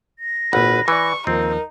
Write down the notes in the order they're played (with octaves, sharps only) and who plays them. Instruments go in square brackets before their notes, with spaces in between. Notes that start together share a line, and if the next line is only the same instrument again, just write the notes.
[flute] A#6
[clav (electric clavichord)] G#1 [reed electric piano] A#2 F#5 [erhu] B4
[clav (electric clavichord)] E3 [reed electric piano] B4 D5 [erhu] C#6
[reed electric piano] D#2 F3 [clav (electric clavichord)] C4 [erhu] D#4 [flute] A#4